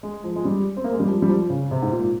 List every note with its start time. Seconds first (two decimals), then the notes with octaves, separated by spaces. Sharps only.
0.03 G#3
0.24 F3
0.36 G#3
0.45 G3
0.77 C4
0.84 A#3
0.92 G#3
1.00 G3
1.08 F3
1.22 G3
1.29 F3
1.50 C#3
1.71 C3
1.82 G#2
1.92 A#2